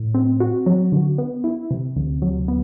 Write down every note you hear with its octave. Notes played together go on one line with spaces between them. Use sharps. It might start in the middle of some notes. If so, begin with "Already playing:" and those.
Already playing: A2
C4
F#4
F#3
D3
B3
E4
C3
D2
F#3
B3